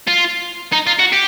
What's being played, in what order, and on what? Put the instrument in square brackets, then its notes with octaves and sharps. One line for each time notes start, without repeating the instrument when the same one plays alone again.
[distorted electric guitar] F4
D#4
F4
F#4
G4